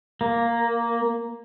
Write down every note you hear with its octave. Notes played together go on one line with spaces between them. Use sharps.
A#3